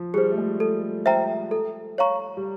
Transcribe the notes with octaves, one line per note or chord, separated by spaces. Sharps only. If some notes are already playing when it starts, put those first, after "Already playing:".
Already playing: F3
G3 G#4 C5
A3
G#3
A4
C5 E5 G5 A#5
A4
C#5 F5 A#5 C#6
G3